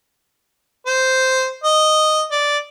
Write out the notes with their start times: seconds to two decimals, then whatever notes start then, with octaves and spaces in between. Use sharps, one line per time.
0.86 C5
1.64 D#5
2.31 D5